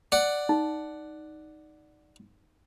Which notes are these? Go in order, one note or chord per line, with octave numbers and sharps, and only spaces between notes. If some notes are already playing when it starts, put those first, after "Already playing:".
D5 F#5
D#4